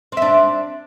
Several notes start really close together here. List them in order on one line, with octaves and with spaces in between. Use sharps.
C4 E5 D4